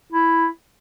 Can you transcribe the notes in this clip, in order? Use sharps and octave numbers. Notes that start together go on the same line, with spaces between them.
E4